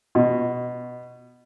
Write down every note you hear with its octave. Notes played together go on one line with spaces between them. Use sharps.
B2